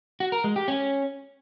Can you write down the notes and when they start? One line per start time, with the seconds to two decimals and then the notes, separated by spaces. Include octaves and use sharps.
0.20 F#4
0.32 A#4
0.44 G#3
0.56 G4
0.68 C#4